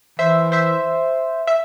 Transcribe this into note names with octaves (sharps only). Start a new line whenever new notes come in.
E3 C5 E5
C5 E5
E5